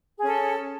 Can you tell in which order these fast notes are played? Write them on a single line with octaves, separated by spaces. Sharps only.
G#4 C#4 A4